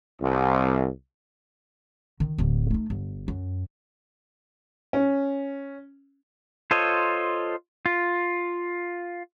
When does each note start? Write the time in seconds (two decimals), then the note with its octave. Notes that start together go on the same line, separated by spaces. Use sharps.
0.22 C2
2.20 D#3
2.38 D1 D2
2.71 A3 D#4
2.90 G1
3.28 F#2
4.93 C#4
6.71 F4 A4 C5 C#5 D#5
7.86 F4